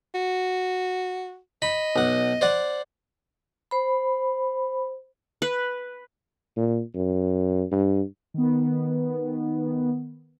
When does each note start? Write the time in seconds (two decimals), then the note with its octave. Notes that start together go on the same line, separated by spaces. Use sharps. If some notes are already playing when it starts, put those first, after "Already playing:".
0.15 F#4
1.62 D#5 B5
1.96 B1 F#5
2.41 C5 D5 F#5
3.71 C5 B5
5.42 B4
6.56 A#2
6.95 F#2
7.72 G2
8.34 D#3 B3